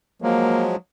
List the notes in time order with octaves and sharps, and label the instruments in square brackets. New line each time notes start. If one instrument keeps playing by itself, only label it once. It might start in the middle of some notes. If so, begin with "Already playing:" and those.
[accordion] F3 F#3 G#3 [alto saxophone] A#3